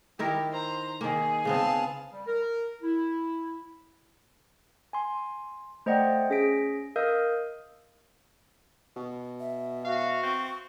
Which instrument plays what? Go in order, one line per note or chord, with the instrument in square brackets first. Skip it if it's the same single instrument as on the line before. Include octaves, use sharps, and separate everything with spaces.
[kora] D#3 E4 A#4 [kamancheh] G4 G5
[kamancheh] C5 A#5
[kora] D#3 A#3 [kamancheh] G#4 G#5
[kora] C#3 B3 C4 [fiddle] F5 A5
[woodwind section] G3
A#4
E4
[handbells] G#5 C6
A3 C5 D5 D#5 F#5 G5
C#4 G#4 A#6 B6 D7
A#4 D#5 F5 D#6 E6 G6
[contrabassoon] B2
[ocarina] E5
[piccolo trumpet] F#4 [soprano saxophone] F5
[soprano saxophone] C4 [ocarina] C#6